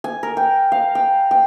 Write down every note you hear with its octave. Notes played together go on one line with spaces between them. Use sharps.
G#5
A#4
G5
F5
G5
G5